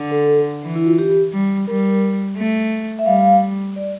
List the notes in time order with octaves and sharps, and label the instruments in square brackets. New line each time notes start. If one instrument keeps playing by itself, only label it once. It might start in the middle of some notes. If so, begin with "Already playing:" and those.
Already playing: [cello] D3
[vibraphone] A4
[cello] E3
[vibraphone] E4
F4
G4
[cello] G3
[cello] G3 [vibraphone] A#4
[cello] A3
[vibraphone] E5
[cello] G3 [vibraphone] F5
[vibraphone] F5
D5